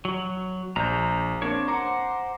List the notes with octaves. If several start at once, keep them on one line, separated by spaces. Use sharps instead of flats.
F#3
A#1 A#5 G6
A#3 C4 D4 C#5
C5 F#5 A#5 D6